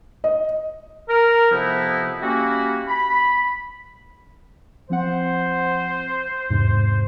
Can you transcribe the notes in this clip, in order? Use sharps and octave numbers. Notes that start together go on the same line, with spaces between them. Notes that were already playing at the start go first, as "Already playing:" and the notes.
D#5
A#4
F2 C3 F3 B3 D#4 E4
G3 A#3 C#4 E4 F#4
B5
F3 C4 C5 F#5
E2 G#2 C3